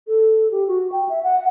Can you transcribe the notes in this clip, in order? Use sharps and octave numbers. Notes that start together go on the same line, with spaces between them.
A4
G4
F#4
G5
E5
F#5